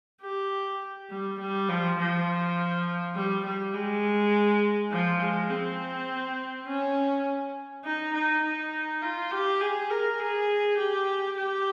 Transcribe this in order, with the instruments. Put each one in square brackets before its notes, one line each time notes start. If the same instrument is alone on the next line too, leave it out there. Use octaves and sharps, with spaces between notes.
[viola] G4
G3
G3
F3
F3
G3
G3
G#3
F3
G#3
C4
C#4
D#4
D#4
D#4
F4
G4
G#4
A#4
G#4
G4
G4